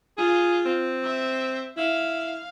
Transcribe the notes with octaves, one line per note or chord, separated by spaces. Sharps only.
F4 G#4
C4
E5
E4 F5